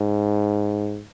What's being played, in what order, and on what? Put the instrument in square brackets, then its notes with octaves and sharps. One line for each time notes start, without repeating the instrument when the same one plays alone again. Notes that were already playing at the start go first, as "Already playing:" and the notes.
Already playing: [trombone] G#2